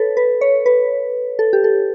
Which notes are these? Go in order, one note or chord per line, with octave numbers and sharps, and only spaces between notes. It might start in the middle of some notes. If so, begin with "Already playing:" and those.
Already playing: A4 B4 C#5
B4
C#5
B4
A4
G4
A4